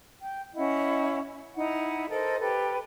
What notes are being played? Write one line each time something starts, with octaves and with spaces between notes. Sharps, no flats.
G5
C#4 E4 D#5 F#5
D#4 E4 F#5
A4 A#4 C5 D#5
G4 A4 B4